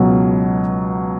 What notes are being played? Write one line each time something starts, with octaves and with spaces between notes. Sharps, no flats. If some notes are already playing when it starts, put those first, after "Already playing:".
Already playing: C#2 B2 F#3